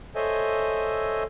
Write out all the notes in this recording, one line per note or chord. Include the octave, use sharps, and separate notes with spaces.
A4 C5 C#5 D#5 E5 G#5